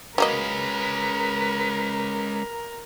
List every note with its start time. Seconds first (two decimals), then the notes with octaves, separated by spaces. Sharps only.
0.18 F#3 G#3 A#3 C#4 A#4 B4 D#5